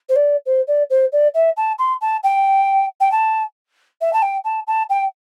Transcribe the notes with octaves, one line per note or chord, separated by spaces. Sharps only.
C5
D5
C5
D5
C5
D5
E5
A5
C6
A5
G5
G5
A5
E5
A5
G5
A5
A5
G5